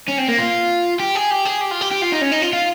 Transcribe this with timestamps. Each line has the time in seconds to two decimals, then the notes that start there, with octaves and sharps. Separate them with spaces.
0.08 C#4
0.18 C4
0.29 A#3
0.38 F4
1.00 G4
1.15 G#4
1.31 G4
1.45 G#4
1.61 G4
1.71 F4
1.81 G4
1.92 G4
2.02 F4
2.12 D#4
2.22 C#4
2.32 D#4
2.42 F4
2.53 F4